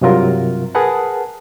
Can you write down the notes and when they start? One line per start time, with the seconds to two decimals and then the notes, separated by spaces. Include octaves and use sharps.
0.01 G2 C3 F#3 F4 A#4
0.75 G#4 A#4 B4 F#5 A5